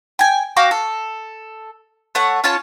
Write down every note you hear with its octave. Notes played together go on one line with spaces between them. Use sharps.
G5 G#5
F#4 F5 G5 D6
A4
A3 C#5 F#5
C#4 F4 C#5 A5